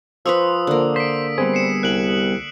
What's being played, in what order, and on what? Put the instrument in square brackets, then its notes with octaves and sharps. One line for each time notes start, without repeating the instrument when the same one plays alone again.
[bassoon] F3 [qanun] B4 C5 C#6 [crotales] D#6 E6
[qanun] D3 A#3
[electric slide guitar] C5 [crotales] B6 D7
[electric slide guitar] G3 B3 G#4 [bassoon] C4
[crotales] C7 C#7 E7
[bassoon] C2 [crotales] F#6 D7 F#7